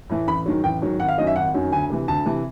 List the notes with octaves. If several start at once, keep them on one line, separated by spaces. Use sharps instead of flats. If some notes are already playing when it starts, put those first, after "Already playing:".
A2 E3
A1 B5
G#2 D#3 F#3
A1 G5
G#2 D#3 F#3
G#1 F#5
F5
F#2 D#3 F#3 D#5
E5
G#1 F#5
F#2 D#3 F#3
D2 G#5
C3 E3
D2 A5
C3 E3